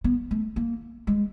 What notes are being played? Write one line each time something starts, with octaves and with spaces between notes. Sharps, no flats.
B3
A3
A#3
G#3